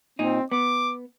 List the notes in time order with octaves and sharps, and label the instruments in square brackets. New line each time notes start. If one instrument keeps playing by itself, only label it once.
[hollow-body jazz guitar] A#2 D#4 [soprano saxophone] C4
[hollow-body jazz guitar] B3 [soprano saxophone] D6